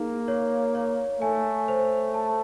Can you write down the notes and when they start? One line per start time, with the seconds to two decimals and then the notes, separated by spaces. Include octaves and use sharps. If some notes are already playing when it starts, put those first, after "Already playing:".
Already playing: A#3 D#4 G#4
0.28 C#5
0.75 C#5
1.21 A3 G#5
1.68 C5
2.14 A5